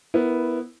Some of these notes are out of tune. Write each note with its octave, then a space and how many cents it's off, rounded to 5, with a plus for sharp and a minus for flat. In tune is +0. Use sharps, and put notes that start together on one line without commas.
B3 +0 E4 +0 A#4 +15